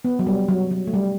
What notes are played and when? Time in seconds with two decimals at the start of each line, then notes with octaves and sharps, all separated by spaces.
0.05 B3
0.19 F#3
0.27 G3
0.48 F#3
0.71 F#3
0.87 A3
0.94 G3